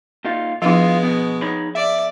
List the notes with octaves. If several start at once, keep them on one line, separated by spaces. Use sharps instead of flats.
A#2 D#4 F4
F3 G#3 B3 D4 E4 F4
B2
D#4 C#5 B5
D5 E5